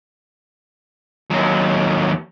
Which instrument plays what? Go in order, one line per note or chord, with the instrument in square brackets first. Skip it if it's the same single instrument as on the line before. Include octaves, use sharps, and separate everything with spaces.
[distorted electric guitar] D#2 F#3